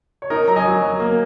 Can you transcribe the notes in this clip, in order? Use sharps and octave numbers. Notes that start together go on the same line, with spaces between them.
C#5
D#4 A#4 D#5
F#3 A#5
D#5 G#5
F#3
F#3
A#3